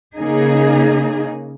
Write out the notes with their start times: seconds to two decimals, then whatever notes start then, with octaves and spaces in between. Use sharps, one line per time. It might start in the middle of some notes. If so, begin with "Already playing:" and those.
0.16 C#3 A#3 D#4 G#4